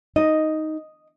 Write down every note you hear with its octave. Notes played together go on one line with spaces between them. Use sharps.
D#4 D#5